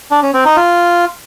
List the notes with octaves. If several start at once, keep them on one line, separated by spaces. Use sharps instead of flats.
D4
C#4
C4
D#4
F4